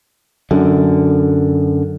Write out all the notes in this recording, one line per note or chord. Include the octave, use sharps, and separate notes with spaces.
F#2 D3